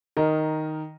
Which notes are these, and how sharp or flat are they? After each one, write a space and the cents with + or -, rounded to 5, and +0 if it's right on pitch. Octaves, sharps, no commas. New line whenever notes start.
D#3 +0 A#4 +0 D#5 +0